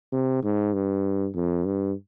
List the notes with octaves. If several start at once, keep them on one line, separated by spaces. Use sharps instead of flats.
C3
G#2
G2
F2
G2